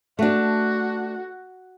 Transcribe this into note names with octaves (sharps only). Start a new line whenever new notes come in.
A3 D4 F#4